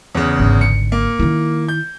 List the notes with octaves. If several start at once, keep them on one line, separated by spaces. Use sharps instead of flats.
E2 C#3
G#1 D3
C#7
A#3
D#3 E4
G6